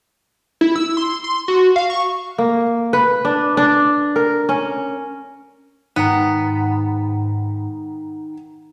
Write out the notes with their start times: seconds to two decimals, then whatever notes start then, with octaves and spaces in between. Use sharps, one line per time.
0.61 E4
0.76 E6
0.97 C6
1.24 C6
1.48 F#4
1.76 F5
1.90 C#6
2.38 A#3
2.93 B4
3.25 D4
3.57 D4
4.16 A#4
4.49 C#4
5.96 G#2 D#3 B3 F#5 G5 A#5